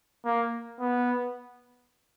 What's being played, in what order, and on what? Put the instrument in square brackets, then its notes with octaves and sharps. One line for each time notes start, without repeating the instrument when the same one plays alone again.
[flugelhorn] A#3
B3